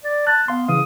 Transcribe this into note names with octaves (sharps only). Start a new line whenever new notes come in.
D5
A5 F#6
B3 F5 C6
C#3 E3 F5 D#6